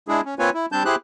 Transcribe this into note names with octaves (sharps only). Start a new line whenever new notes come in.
G#3 D4 E4 G#4
C#4
A#3 C4 F4 B4 C#5 G#5
E4
G3 C4 D4 A5 G6
E4 G4 G#4 C5 F#6